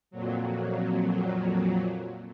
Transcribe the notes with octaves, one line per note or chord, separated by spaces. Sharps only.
F2 A#2 F#3